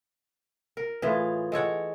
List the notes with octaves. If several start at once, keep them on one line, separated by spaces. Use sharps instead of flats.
A#4
A2 E3 F4 G#4
G#3 A4 C#5 F#5